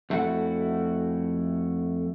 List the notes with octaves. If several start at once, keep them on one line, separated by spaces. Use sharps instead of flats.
F2 A3 E4 F#4 F#5